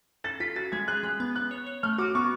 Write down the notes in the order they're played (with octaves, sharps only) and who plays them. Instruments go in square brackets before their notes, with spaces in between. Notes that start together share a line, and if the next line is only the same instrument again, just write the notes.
[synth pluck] A4 [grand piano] A6
[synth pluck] F4 [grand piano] B6
[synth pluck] F#4 [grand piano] A6
[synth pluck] G#3 [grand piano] G#6
[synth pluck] G#4 [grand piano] F#6
[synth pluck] G#3 [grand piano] F#6
[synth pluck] B3
[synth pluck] B3 [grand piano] F#6
[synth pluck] C#5
C#5
[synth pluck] A3 [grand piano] F6
[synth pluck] F#4 [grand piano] D6
[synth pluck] B3 [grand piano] C#6